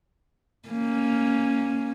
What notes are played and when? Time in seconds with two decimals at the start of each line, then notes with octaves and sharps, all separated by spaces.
0.69 A#3 C#4